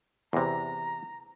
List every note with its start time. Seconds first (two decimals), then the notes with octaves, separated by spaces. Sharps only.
0.33 E2 C3 A#5